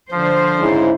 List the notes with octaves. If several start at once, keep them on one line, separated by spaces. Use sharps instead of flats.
D3 F3 C5
G#2 C#3 E4